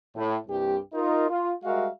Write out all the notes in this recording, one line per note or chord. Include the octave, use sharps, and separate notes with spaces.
A2
C2 G2 G4
D#4 F4 A#4
F4
G3 G#3 F#4 A#4 E5 F5